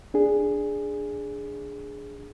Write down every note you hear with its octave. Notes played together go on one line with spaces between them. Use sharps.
D4 G#4